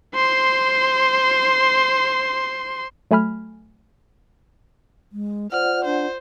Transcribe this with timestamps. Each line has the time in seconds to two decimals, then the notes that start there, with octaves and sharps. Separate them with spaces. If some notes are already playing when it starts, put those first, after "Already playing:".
0.15 C5 C6
3.11 F#3 A3 G#5 B5 F6
5.12 G#3
5.52 F4 C5 D5 F#5 F6
5.85 D4 C5